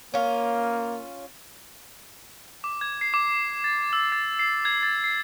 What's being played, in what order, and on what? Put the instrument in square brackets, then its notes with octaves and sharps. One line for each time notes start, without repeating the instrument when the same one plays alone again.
[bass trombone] A#3 [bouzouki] C#4 F4
[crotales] D6
G#6
C7
D6
A6
E6
A6
C7
G#6
A6
C7